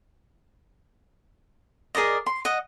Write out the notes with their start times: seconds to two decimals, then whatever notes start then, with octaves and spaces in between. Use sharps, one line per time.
1.95 G#4 A#4 D5 D#5
2.26 C6
2.45 D#5 F#5